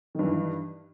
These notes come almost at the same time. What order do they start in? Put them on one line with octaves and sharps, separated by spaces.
D#3 G2 E3